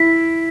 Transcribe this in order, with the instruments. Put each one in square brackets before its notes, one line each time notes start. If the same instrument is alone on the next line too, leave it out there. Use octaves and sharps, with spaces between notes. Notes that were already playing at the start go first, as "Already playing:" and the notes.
Already playing: [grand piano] E4 [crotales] B6